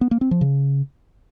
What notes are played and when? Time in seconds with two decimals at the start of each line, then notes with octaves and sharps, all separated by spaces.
0.01 B3
0.11 A#3
0.21 C4
0.31 F3
0.41 C#3